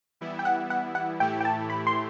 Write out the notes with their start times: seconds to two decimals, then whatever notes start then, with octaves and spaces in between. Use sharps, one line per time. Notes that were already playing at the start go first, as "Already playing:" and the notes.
0.21 E3 G3 B3 E4
0.39 G5
0.45 F#5
0.70 F#5
0.95 F#5
1.20 A2 E3 A3 E4 G4 G5
1.41 G5
1.45 A5
1.70 B5
1.87 C6